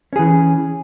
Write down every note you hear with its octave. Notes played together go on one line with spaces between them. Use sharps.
E3 C#4 G#4